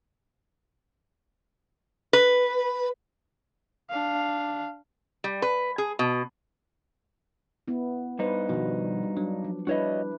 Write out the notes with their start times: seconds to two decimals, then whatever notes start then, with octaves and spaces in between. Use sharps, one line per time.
2.13 B4
3.90 D4 F5
5.24 G3
5.42 B4
5.78 G#4
5.99 B2
7.68 B3 E4
8.19 G2 D#4 B4 C5
8.49 B2 D#3 F3 G3 F#4
9.17 F#3 D4
9.44 F3
9.67 G3 D4 E4 F#4 B4 C#5 D#5